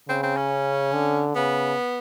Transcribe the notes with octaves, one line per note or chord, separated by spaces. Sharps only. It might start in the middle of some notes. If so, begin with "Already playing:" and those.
C#3 C4
C4
C#4
D3
C#3 B3